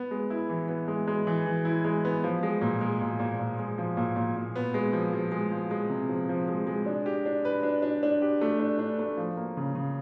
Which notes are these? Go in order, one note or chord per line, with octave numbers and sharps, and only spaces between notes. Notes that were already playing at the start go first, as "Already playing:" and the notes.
Already playing: B3
G#3
E4
E3
B3
G#3
G#3
E3
E3
E4
G#3
B3
F3
G#3
A#2
G#3
A#2
A#2
A#2
G#3
F3
A#2
A#2
A#2
B3
G#3
F3
F3
G#3
F3
G#3
C3
F3
F3
G#3
G#3
D4
G4
D4
B4
D4
D4
D4
G4
A3
D4
D4
A3
F3
A#3
C#3
C#3